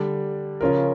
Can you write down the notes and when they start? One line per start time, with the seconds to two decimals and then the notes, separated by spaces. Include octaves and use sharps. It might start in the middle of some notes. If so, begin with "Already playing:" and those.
Already playing: D3 G3 D4
0.61 C#3 F3 C#4 F4 A#4